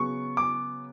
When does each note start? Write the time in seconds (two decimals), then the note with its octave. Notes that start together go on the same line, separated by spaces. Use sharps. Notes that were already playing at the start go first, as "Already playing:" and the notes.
Already playing: C#3 F#3 B3 C#6
0.37 D6